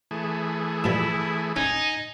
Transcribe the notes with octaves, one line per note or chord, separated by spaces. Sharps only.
E3 A3 G#4
G2 F3 G3 E4
C#4 D#4 G#5